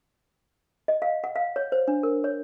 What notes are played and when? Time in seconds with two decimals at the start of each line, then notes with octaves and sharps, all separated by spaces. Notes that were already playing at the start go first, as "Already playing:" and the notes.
0.88 D#5
1.02 F5
1.24 F#5
1.36 F5
1.56 C#5
1.72 C5
1.88 D4
2.03 A#4
2.24 C#5